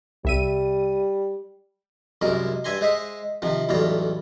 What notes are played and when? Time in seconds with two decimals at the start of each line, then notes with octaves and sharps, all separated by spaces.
0.25 C2 G3 E5 D#7
2.21 C2 F#2 G#3 A#4
2.64 G2 E5 G#5 A#5 C6
2.81 G#3 C5 D#5 E5
3.42 C3 D#3 F3
3.69 B1 E2 A2 G3 F4 A#5